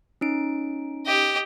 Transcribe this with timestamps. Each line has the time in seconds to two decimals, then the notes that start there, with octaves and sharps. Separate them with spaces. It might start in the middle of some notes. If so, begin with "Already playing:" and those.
0.21 C#4 D#4 D7
1.06 G4 D#5